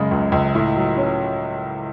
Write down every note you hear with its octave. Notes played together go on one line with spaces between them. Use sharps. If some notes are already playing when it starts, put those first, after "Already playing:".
Already playing: F#2 C#3 G#3
C#2
C#2
A2
F#3
C#4